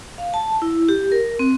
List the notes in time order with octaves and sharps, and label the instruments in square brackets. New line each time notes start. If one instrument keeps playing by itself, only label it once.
[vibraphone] F5
A5
E4
G4
A#4
C4